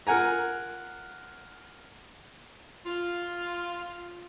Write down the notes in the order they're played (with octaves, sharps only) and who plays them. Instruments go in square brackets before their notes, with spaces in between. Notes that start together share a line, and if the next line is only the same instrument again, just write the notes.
[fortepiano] F4 A#4 F#5 G#5 A#5
[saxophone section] F4